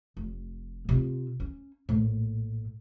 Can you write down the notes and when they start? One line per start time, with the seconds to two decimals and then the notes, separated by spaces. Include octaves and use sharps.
0.17 F1
0.89 C3 F4
1.40 C#4
1.89 A#1 A2